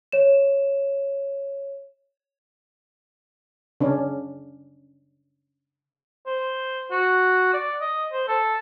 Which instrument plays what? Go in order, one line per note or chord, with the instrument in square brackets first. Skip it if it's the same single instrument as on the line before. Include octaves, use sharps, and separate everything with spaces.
[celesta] C#5 E7
[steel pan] C#3 C#4 D4
[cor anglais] C5
F#4
D5
D#5
C5
A4